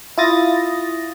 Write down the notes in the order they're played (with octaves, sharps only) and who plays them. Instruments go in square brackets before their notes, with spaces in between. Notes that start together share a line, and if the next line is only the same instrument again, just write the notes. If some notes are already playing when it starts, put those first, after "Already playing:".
[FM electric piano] E4 F4 D#6 A6 A#6